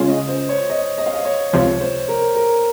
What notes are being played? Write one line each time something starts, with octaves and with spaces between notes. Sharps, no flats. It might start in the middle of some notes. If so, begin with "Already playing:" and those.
Already playing: C#3 G#3 C#4 F4
D#5
C5
C#5
D#5
D#5
F5
D#5
C#5
C#2 C3 F3 C#5
C5
A#4
A#4